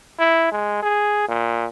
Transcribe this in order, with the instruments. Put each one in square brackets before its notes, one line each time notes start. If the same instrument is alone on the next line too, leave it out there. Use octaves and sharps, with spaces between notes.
[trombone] E4
G#3
G#4
A#2